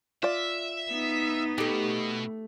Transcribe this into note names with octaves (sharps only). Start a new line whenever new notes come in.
F4 D5 E5
B3 D#4
B2 A3 G4